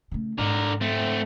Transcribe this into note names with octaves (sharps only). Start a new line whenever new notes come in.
C#3 A3
G#2 D3 A#4
A3 C4